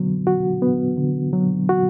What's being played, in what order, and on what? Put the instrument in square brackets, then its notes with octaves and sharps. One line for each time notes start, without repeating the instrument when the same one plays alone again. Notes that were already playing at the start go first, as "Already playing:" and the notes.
Already playing: [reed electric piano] D3 F#3 B3
F#4
B3
D3
F#3
F#4